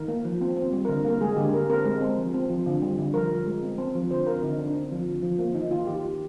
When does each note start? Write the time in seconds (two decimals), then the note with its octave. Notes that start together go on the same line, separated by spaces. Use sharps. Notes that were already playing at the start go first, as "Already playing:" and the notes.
Already playing: D#3 A#4
0.08 A#3
0.25 F3
0.41 C4
0.56 C4
0.73 G3
0.85 A#4
0.89 D3
1.05 A#3 A#4
1.21 G#3 G#4
1.37 D3 G4
1.53 D3 A#4
1.69 C4 A#4
1.85 G#3
2.01 C4
2.17 F3
2.34 C4
2.50 F3
2.66 D3
2.82 G3
2.98 D3
3.14 F3 A#4
3.30 F3
3.46 G#3
3.63 C4
3.78 C4
3.95 F3
4.10 D3 C5
4.27 C4 A#4
4.42 D3 D#4
4.58 D3 D4
4.74 C4
4.92 F3
5.08 D3
5.23 F3
5.39 A#3
5.55 D#3 D#4
5.71 D#3 F4
5.87 D#3 G4
6.04 D#3